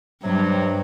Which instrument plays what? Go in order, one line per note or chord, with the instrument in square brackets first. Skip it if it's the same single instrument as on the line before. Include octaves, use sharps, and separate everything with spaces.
[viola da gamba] G2 [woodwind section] C3 F#3